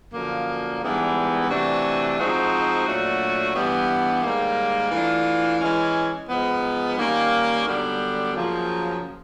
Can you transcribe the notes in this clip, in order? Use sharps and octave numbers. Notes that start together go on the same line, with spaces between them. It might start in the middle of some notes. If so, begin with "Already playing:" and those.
F#2 D3 F3 A#3
G#2 E3 G3 B3 D4
C3 E3 A3 D4 F#4
F3 G#3 C4 D#4 F#4
A#2 F#3 A3 D4 F#4
G2 E3 G3 B3
G#2 D#3 G3 A#3
E3 A3 D4 F4
E3 G#3 C#4
G#2 F3 G#3 B3
D#3 G3 A#3 C#4
F#2 D3 G3 B3 D4
F#2 C#3 F3 A#3